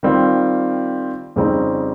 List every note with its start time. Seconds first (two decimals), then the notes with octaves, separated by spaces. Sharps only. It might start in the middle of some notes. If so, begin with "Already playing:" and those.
0.03 D#3 G3 C4 F4
1.36 F2 C#3 G3 C4 D#4